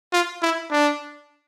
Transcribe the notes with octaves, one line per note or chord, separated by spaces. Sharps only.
F4
E4
D4